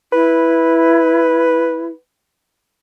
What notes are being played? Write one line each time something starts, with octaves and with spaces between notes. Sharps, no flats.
E4 B4